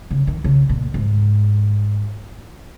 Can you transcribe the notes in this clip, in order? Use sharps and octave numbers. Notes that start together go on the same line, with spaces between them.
C#3
D#3
C#3
A#2
G#2